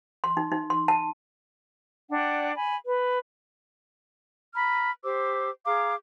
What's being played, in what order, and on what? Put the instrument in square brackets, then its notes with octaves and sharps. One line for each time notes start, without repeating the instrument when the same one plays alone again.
[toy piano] C6
D#4
D#4
C6
A5
[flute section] D4 D5 F#5 G5
G#5 B5
B4
A#5 B5 F6
G4 C5 D6 E6
G#4 F5 A#5 D6